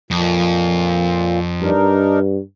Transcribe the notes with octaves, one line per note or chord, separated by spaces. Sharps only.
F2 A#2
G2 D4 D#4 A#4